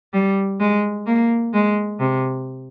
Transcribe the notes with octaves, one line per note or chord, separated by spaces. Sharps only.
G3
G#3
A#3
G#3
C3